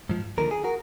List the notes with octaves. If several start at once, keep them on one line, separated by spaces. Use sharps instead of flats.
G#2 F3
D#2 D3 F3 A#4
G#4
F#4 A#4